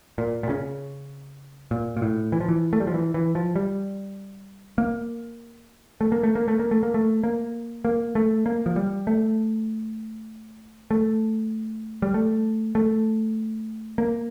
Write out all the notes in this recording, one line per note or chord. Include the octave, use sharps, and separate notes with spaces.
A#2
A#2
C#3
A#2
A#2
A2
E3
F3
E3
A3
G3
F3
E3
E3
F3
G3
A#3
A3
A#3
A3
A#3
A3
A#3
A3
A#3
A3
A#3
A#3
A3
A#3
F3
G3
A3
A3
G3
A3
A3
A#3